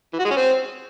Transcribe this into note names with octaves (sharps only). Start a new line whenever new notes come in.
E3
F#4
G#3
C#4
C4